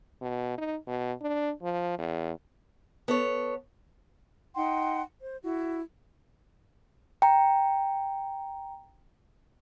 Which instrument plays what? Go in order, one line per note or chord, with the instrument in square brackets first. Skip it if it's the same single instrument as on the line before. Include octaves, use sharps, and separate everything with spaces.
[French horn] B2
D#4
B2
D4
F3
E2
[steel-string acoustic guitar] B3 A4 C#5
[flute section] D#4 F#5 G5 C6
C5
E4 F#4
[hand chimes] G5 A#5